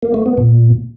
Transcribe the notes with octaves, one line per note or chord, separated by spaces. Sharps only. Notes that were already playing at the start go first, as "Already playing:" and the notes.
A#3
A3
B3
A#2